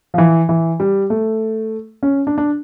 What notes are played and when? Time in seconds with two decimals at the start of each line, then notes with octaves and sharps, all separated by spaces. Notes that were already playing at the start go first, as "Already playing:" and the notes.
0.14 F3
0.18 E3
0.49 E3
0.80 G3
1.10 A3
2.03 C#4
2.27 D4
2.38 D4